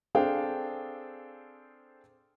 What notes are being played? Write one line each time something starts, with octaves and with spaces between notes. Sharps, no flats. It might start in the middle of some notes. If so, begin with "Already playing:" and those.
C4 D4 G#4 A4 F5 G5